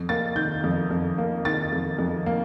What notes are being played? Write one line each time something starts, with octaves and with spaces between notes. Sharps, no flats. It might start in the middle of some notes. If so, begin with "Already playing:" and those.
Already playing: F2
A#3 A6
D#3 G6
F2
F2
A#3
D#3 A6
F2
F2
A#3